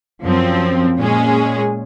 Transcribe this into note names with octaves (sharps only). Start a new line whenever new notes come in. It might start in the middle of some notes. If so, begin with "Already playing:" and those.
F#2 F3 C4
A#2 G#3 C#4 G#4